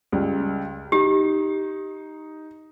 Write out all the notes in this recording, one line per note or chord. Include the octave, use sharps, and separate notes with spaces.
C#2 G3
D#4 G4